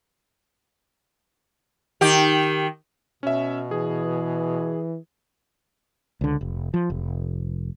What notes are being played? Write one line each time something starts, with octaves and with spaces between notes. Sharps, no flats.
D#3 G4
B2 C#4 E5
E3 G#4
C#2 D3
F1
F3
F1